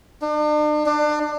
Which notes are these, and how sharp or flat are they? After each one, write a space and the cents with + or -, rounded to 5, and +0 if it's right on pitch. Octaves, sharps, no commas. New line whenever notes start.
D4 +40
D4 +30